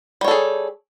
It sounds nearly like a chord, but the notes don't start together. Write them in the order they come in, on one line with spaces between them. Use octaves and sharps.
G3 C#5 A4 G#4